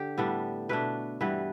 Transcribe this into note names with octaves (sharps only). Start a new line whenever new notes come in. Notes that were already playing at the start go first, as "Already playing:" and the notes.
Already playing: D3 G4
A2 G3 B3 D4
B2 A3 D4 B4
G2 E3 G3 B3 B4